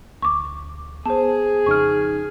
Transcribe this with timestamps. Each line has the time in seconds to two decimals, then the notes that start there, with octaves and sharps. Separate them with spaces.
0.22 D2 C#6 D6
1.06 B3 G#4 C5 A5
1.66 F2 C#3 D#4 C#6 F6